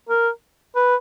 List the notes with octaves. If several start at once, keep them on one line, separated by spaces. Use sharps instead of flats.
A#4
B4